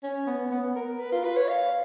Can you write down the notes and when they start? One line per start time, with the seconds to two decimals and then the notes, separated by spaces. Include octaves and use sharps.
0.03 C#4
0.27 B3
0.51 B3
0.76 A#4
0.99 B4
1.12 F4
1.24 B4
1.36 C#5
1.49 F5